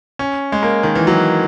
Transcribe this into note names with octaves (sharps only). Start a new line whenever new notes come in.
C#4
G#3
A#3
D#3
E3
F#3